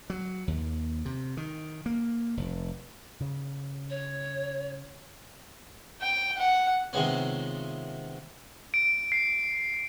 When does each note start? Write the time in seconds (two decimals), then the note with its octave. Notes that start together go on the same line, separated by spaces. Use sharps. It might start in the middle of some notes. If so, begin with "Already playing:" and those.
0.10 F#3
0.48 D#2
1.05 C3
1.37 D#3
1.86 A#3
2.37 F1
3.21 C#3
3.90 C#5
6.02 G5
6.38 F#5
6.93 C3 D#3 F3 G#3 B3 C#4
8.74 D7
9.12 C7